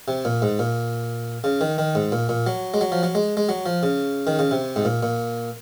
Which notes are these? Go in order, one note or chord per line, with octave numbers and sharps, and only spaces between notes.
C3
A#2
G#2
A#2
C#3
D#3
D#3
G#2
A#2
A#2
F#3
G#3
F#3
F3
F#3
G#3
G#3
F#3
F3
C#3
D#3
C#3
C3
G#2
A#2
A#2